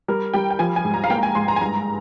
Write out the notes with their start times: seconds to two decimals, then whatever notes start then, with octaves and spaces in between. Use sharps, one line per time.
0.08 G3 A#4
0.34 G3 G5
0.50 G5
0.59 F3 G#5
0.76 G#5
0.85 G#2
0.94 A#5
1.04 F5
1.10 A#3 G5
1.18 A#5
1.23 G#5
1.35 G#2 C6
1.48 A#5
1.56 G#5
1.61 G2 A#5